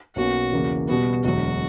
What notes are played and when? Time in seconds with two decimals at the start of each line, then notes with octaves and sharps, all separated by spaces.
0.16 B1 B2 A#3 C#4 F#4
0.52 E2 C#3 E3 A#3
0.88 B2 G3 B3 F#4
1.24 E1 D2 D3 F#3 F#4